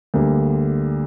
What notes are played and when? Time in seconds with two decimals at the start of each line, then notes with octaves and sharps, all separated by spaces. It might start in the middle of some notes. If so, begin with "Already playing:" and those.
0.14 D2 D3 G3 A#3